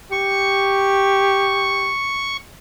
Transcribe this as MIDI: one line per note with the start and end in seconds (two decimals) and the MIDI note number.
0.12 1.91 67
0.12 2.37 85